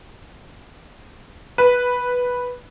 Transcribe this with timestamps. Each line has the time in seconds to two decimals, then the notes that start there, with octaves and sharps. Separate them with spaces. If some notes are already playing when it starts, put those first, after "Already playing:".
1.58 B4